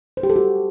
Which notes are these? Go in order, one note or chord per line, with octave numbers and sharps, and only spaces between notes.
C5
G4
A4
F#4